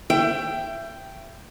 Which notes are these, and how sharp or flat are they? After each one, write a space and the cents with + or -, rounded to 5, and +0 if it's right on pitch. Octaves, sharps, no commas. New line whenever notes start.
E5 +30 G5 +0